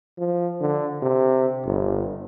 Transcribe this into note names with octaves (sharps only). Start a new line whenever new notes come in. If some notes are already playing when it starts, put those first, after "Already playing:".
F3
D3
C3
G1